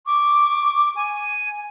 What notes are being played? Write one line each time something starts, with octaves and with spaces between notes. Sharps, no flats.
C#6 D6
G#5